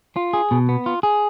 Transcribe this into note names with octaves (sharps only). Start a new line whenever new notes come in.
F4
G#4
B2
B3
F4
G#4